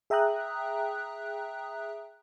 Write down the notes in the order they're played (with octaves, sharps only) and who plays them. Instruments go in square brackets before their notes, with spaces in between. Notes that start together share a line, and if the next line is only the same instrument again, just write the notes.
[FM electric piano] G#4 E5 G5 A#5 D#6 F#6